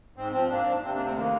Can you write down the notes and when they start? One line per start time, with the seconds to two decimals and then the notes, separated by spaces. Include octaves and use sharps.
0.16 G#2 C4
0.33 F3 C4
0.49 G#2 A#3 D4
0.66 G#2
0.83 C3 C4
0.94 A#3 D4
0.99 D2
1.05 C4
1.16 D#3 A#3